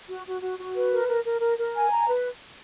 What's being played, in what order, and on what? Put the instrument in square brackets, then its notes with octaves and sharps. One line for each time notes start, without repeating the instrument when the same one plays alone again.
[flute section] F#4
F#4
F#4
F#4
B4
A#4
A#4
A#4
A#4
A#4
G#5
A#5
B4